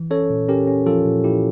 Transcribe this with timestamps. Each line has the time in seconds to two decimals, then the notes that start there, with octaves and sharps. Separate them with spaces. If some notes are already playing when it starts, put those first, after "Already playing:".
Already playing: E3
0.11 C#4 A4 C#5
0.30 A#2
0.49 C#4 G4 A#4
0.67 C#4
0.86 F3 F4 A4
1.05 A#2
1.24 A#2 E4 G4